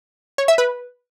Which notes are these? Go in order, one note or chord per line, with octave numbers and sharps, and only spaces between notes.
C#5
E5
B4